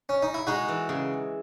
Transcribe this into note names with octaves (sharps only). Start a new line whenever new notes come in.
C#4
D#4
E4
G#3 D#4 F#4
E3
C#3